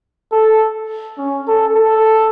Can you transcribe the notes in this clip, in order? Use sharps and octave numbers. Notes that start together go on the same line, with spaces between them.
A4
C#4
A4
A4